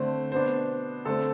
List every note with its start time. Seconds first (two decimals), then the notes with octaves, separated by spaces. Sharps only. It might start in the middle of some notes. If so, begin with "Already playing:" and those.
Already playing: D3 A3 C4 C5
0.32 B2 B3 D4 C5
1.05 D3 A3 C4 A4